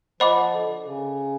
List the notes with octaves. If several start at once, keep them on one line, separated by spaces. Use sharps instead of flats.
F3 C5 D#5 F#5 B5 D6
D3
C#3